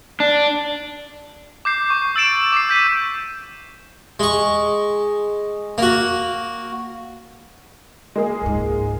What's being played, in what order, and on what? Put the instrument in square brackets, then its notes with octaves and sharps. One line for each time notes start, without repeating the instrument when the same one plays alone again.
[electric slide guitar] D4
[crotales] D6 G6 C7
C#6
E6 A6 D7 E7
D6 C7
G6 B6 D#7
[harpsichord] G#3 C#6
A#3 F#4
[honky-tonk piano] G#3 A#3 G#4
[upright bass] C#2 G#2